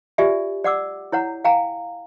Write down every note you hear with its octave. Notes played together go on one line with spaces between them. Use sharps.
F4 G4 D5 E5 G#5
D5 F#5 D6 E6
E4 C#5 F#5 A#5
F5 G5 G#5 A#5